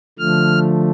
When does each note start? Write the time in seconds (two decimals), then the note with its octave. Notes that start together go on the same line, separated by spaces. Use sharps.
0.19 D3 F3 A3 F6